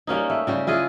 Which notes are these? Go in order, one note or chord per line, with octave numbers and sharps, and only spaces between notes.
G3 A#3 C#4 D#4
A3
C#3 G3 G4
E4 F4 G#4 D#5